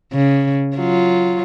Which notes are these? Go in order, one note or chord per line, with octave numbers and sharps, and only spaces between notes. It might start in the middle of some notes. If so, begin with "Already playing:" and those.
C#3
F#3 F4